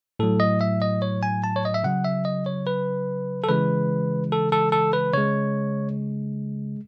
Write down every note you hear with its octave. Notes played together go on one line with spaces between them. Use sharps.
A2 F#3 A4
D#5
E5
D#5
C#5
G#5
A5
C#5
D#5
E5
C#3 F#3 F#5
E5
D#5
C#5
B4
A4
C#3 E3 G#3 B4
A4
A4
A4
B4
C#3 G#3 C#5